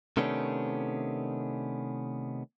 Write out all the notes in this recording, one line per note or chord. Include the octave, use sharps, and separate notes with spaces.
C3 D#3 A3 B3 C#4 D4